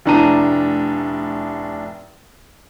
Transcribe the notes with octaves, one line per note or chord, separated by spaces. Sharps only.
F1 A2 D4 A5 A#5 D#7